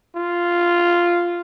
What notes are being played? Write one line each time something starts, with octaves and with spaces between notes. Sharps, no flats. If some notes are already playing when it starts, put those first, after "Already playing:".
F4